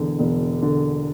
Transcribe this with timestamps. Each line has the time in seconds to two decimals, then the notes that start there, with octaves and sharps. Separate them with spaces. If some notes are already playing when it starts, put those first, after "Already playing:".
Already playing: E1 E2 D3
0.19 E1
0.62 D3